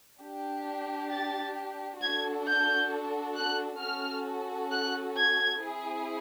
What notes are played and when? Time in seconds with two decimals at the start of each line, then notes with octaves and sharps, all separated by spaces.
0.20 D4 G4
1.11 A6
2.01 D4 F#4 A4 G#6
2.46 G6
3.36 F#6
3.81 C#4 F#4 A4 F6
4.71 F#6
5.17 G#6
5.61 C4 E4 G#4